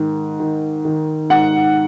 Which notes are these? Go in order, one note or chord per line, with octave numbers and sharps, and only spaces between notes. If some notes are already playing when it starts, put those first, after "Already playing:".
Already playing: G#2 D#3
D#3
D#3
G#2 F#5